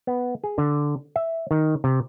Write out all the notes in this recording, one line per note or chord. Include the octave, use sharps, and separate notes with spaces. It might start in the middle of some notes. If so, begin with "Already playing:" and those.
B3
G#4
D3
E5
D#3
C3